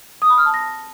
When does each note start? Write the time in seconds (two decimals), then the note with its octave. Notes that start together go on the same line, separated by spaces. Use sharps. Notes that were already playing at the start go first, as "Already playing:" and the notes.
0.22 D#6
0.30 B5
0.38 F6
0.46 A5
0.54 A#6